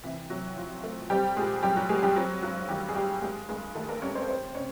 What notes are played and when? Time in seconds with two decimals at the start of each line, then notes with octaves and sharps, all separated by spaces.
0.04 C3 E3 E4
0.30 C3 F#3 F#4
0.57 F3
0.84 A3
1.10 G3 C4 G4
1.36 A#2 G#3 G#4
1.63 F#3 G3 G4
1.76 F#3 F#4
1.89 G#3 A3 G#4
2.03 G3 G4
2.16 F#3 C4 F#4
2.42 G2 F#3 F#4
2.69 D#3 G3 G4
2.89 G#4
2.95 G3 G4
3.22 G#3 A#3 G#4
3.49 G2 G#3 G#4
3.75 D#3 A3 A4
3.89 A#3 A#4
4.02 G3 C#4 C#5
4.15 C4 C5
4.28 C4 C5
4.55 C3 C#4 C#5